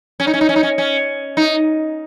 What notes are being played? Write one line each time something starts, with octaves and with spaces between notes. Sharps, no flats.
C#4
D#4
C#4
D#4
C#4
D#4
C#4
C#4
D#4